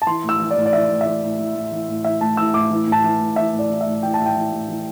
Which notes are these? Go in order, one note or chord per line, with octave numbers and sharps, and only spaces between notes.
A5
E3 C6
A2
E6
E3
D5
A2
D5
E3 E5
A2
E5
E3 D5
A2
E3
A2
E3
A2
E3 E5
A2 A5
E3 E6
A2 D6
E3
A2 A5
E3
A2
E3 E5
A2
D5
E3
E5
A2
E3 G5
A5
A2
G5
E3
A2
E3